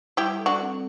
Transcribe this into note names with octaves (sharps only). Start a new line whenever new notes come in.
G3 E4 G4
A4
D4 F#4
C4